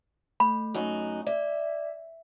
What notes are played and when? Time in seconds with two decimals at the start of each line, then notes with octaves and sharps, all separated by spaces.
0.40 A3 B5
0.74 F#2 D#4 F#4
1.27 D5 E5